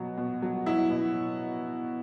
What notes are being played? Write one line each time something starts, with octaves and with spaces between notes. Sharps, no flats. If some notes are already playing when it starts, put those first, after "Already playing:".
Already playing: B2 F#3
B2
F#3
F#3 E4
B2